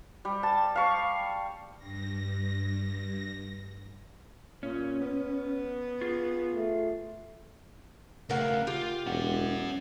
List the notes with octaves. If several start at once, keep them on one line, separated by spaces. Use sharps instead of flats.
G3
A5
F5 C#6
G2 A#6
A#2 C#4
B3
F4 G#4
A3
C#3 A3 A#4 F5 F#5
F4 G4
E1 C#4 F#5